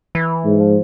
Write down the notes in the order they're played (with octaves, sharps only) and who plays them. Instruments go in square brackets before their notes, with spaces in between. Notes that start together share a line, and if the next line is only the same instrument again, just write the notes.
[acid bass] E3
[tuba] G#2
[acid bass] F3